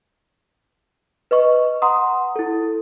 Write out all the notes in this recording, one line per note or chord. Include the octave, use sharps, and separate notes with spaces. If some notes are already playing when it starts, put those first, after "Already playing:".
B4 D#5 C#6
F#5 A#5 C6 D#6
E4 A4